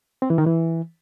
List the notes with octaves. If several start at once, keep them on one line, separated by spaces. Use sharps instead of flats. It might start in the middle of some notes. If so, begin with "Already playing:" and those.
C4
E3
D#3
E3